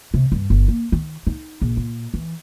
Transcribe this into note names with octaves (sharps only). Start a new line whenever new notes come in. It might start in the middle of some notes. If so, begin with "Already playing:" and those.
C3
G2
G1
A#3
D#3
D#4
A#1
A#2
E3